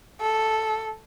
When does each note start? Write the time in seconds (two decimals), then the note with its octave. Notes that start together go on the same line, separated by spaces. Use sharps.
0.21 A4